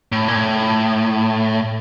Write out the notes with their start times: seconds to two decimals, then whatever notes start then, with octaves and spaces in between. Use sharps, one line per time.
0.12 A2
0.28 A#2
0.35 A2